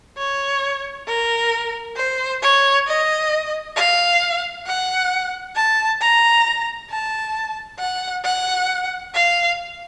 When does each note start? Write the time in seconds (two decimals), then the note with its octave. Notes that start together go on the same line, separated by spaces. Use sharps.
0.17 C#5
1.07 A#4
1.96 C5
2.42 C#5
2.87 D#5
3.76 F5
4.67 F#5
5.56 A5
6.01 A#5
6.90 A5
7.79 F#5
8.25 F#5
9.14 F5